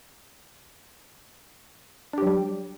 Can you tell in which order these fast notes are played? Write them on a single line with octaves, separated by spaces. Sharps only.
D4 G4 F#3 G3